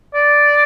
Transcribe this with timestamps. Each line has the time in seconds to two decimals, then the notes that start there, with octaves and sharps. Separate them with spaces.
0.14 D5